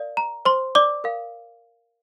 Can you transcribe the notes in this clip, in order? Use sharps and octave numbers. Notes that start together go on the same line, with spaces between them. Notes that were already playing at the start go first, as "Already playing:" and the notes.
Already playing: A#4 D5 F5
A#5
C5 C6
D5 D6
A#4 F5